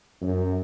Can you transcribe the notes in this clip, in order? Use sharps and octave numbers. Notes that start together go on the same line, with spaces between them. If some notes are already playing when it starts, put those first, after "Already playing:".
F#2